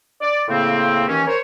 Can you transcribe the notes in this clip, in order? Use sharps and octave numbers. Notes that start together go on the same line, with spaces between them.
D5
A2 C#3 A#3 C4
D#2 E3 C#4
A#4 C5 C#5